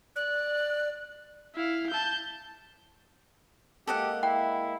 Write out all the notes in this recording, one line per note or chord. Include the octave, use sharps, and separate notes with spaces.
D5 F#6
E4 F5
A5 G6
G#3 A#3 G4 A4 D#5 F#5
E4 G5